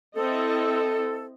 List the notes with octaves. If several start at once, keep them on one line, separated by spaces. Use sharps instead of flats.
C4 E4 A4 D#5